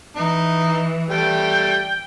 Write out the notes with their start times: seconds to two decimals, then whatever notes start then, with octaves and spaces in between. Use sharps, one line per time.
0.16 E3 D#4
1.09 G3 A3 G5